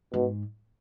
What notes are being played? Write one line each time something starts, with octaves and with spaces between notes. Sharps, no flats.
G#2 B2